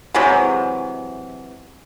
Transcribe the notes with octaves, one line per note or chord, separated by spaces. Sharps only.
C3 E3 F#3 G#3